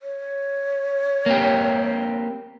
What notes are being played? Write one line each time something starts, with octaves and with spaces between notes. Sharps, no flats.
C#5
A#3 C4 G4